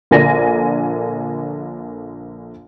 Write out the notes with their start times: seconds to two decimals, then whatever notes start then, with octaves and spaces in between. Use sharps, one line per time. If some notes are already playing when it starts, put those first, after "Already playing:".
0.11 A#1 D3 A#4 D5 G#5 A#6